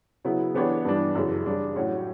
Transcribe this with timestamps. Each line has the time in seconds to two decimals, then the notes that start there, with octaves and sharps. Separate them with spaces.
0.24 C#3 F#3 B3 E4
0.54 E3 B3 D4 G4 C#5
0.85 G2 E3 G3 D4
1.15 F#2 C#3 E3
1.46 C#3 G3 D4
1.76 A2 F#3 C#4 F#4 C#5